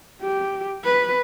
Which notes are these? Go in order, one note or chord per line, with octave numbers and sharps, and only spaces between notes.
G4
B4